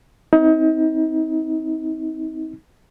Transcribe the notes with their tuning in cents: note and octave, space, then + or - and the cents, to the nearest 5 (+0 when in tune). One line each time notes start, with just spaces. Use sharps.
C4 +0 D#4 +35